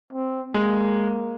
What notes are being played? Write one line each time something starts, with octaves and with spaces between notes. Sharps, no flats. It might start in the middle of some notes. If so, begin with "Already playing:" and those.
C4
G#3 A#3